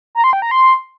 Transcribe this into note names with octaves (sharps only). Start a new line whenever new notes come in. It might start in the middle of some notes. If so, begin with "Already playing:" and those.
A#5
C6
G5
A#5
C6